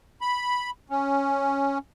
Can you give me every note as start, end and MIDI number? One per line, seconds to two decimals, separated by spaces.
0.21 0.70 83
0.90 1.78 61